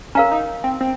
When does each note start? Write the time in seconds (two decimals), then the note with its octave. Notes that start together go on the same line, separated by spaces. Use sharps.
0.15 C#4 A#4 F5 A#5
0.31 D#4
0.64 C4
0.81 C4